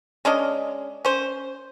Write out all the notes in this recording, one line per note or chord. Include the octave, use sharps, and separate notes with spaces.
G#3 C#4 D4 D#5
C#4 C5